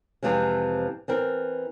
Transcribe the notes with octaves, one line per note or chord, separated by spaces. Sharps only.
F2 C3 E3 F3 G#3
E3 C4 A#4